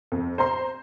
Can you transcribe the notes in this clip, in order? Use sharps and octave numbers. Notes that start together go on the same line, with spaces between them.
F2
C5 A#5 C6